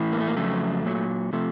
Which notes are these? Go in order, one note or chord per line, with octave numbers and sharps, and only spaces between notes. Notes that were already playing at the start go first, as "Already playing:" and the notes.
Already playing: A2 E3
A#3
A3
A#3
F2 C#3 F#3 A3
A#2 F#3
C3 F3 A3